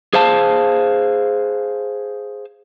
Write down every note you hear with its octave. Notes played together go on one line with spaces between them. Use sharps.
G#4 C5 F5 A5